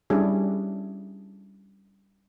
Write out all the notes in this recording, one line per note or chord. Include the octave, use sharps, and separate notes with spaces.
G3 C#4 D4 E4 G4 G#4